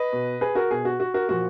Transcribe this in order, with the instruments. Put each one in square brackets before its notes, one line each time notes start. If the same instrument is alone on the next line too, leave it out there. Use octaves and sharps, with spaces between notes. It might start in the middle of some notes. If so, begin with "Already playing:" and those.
Already playing: [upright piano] B4 D#5
B2
G#4 B4
F#4 A#4
B2 G#4
F#4
F#4
F#4 A#4
A#2 F3 F#4